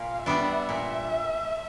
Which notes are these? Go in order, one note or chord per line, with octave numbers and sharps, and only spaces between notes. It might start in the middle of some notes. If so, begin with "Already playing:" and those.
Already playing: A#2 F5
G3 B3 D4 E5
A#2